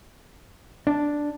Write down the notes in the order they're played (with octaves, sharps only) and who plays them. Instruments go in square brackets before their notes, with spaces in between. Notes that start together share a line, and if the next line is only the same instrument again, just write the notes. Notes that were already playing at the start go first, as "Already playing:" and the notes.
[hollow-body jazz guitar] D4